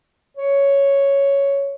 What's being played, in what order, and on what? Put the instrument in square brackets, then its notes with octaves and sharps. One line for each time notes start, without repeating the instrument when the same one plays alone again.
[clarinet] C#5